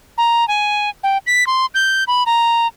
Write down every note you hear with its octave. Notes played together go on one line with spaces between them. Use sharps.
A#5
G#5
G5
B6
C6
G6
B5
A#5